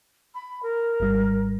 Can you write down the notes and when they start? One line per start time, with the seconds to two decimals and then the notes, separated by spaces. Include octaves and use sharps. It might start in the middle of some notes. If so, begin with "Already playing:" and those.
0.35 B5
0.63 A#4
1.00 G#1 G#2 G3